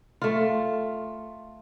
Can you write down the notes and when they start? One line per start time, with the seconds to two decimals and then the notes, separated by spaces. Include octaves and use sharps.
0.22 A3 F4